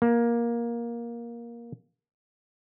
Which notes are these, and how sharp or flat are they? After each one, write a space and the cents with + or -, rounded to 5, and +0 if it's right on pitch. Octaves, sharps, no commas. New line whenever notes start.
A#3 +15